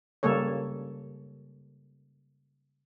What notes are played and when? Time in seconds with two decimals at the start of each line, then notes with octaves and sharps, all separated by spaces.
0.23 C#3 G3 A#3 A4 C#5